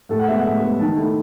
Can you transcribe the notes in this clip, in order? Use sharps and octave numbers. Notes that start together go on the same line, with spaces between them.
A2 A4
F#5
G#3 B3 E5
F#5
A2
G#3 B3
D#3 A5
A3 E4